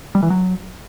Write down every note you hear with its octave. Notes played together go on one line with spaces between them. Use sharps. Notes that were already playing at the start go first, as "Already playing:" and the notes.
G3
E3
F#3